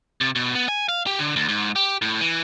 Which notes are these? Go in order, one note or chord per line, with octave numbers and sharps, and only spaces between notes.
C3
B2
B3
G#5
F5
G4
D3
D2
G#2
G4
A2
E3